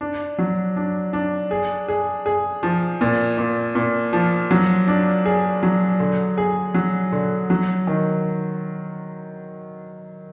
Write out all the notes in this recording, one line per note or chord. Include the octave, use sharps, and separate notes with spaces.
D4
F#3
D4
D4
G#4
G#4
G#4
F3
A#2
A#2
A#2
F3
F#3
D4
G#4
F#3
D3
G#4
F#3
D3
F#3
D#3